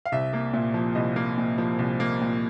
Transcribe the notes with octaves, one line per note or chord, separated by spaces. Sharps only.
F5
C2 E5
A#3
A#2 E5
F3
C2 D#5
A#3
A#2
F3
C2
A#3
A#2